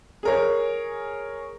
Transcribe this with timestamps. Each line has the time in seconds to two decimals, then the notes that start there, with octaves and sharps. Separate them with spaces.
0.23 G#4 A#4 C#5